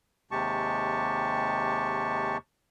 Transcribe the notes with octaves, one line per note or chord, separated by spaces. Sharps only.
D#2 C3 G#3 G4 A5 C#6